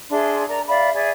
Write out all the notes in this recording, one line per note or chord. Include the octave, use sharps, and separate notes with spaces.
D4 G#4 E5 C6
A#4 D5 A#5
D5 E5 F5 B5
G#4 D5 E5